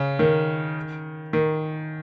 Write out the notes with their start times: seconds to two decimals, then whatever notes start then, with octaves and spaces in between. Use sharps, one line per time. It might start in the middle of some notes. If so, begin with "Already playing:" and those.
Already playing: C#3
0.19 D#3
1.33 D#3